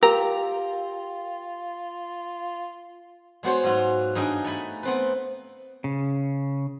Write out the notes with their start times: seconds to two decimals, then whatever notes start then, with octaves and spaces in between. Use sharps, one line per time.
0.03 F4 G4 A#4 A#5
3.43 G#3 B3 F#4 C5 C#5
3.64 G#2 F#3 F4 F#4
4.15 G2 D#4 G#4 D#5 G5
4.44 A3 B4 G#5 B5
4.83 B3 C4 B4
5.84 C#3